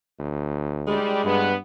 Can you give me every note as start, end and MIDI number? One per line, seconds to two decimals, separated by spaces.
0.19 0.97 38
0.87 1.19 55
0.87 1.53 56
1.24 1.56 43
1.24 1.54 59